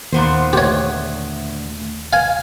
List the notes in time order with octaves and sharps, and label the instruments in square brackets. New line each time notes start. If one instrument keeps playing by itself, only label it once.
[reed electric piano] D#2 [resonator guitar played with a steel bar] A#2 B3 C5
[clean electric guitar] D2 [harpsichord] G4 C#5
[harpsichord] F5 G#5